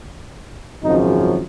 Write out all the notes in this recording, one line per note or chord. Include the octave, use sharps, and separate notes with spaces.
G#1 F#2 C#3 F3 D#4